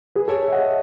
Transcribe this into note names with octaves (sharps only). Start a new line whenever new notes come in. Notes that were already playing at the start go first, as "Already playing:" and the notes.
G#4 B4
A4 C#5
E5
D#5 F#5